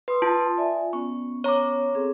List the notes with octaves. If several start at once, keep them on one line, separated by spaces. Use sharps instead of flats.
B4 C6 D#6
F4 A5
D5 E5 G#5
B3 C#4 C#6
C#5 A#5 C#6 D6
C4 G#4 A4